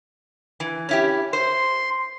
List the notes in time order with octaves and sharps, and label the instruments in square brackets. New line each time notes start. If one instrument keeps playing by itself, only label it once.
[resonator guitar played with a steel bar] E3
C#4 E4 G4
[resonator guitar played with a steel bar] C5 [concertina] C6